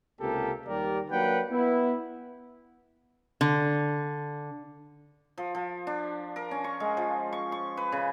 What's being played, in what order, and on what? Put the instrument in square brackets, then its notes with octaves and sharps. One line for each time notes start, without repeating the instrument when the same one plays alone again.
[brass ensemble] C#2 C3 A#3 G4 A4 A#4
D#2 G3 G4 A#4 D5
F#3 A#3 D4 B4 F#5 G5
B3 E4
[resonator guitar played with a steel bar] D3
[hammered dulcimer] F3
F3
D4
A#4
C#4
C#6
G#3
F3
C#6
C#6
B4
C#3